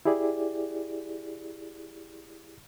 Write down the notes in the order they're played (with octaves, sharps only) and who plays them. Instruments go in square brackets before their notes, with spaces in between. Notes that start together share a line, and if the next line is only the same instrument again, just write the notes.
[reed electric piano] E4 G4 G#4 D5